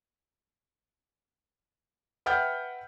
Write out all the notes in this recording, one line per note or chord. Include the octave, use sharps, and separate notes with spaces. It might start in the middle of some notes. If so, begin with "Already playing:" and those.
B4 E5 F#5 G5 F6 G6